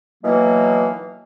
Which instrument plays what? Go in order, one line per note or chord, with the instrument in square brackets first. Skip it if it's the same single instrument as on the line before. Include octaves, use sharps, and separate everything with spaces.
[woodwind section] B2 D#3 E3 F#3 A#3